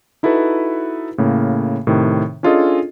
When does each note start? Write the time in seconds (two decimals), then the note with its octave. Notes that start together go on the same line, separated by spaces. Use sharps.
0.23 D#4 E4 F#4 A4 B4
1.18 A2 C#3 A#3
1.87 A2 C3 D#3
2.43 C#4 D4 F4 G#4 A4 D#5